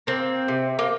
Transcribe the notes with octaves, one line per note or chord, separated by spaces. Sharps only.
A#3 C4
C3
A#3